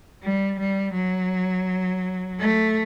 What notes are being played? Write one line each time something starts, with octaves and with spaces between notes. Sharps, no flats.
G3
G3
F#3
A3